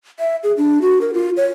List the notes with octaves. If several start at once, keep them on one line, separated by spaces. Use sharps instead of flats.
E5
G#4
D4
F#4
A#4
F4
C#5